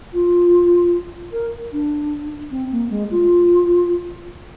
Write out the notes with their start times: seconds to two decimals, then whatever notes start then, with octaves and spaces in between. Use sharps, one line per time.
0.14 F4
1.33 A#4
1.73 D4
2.51 C4
2.72 A#3
2.90 G#3
3.11 F4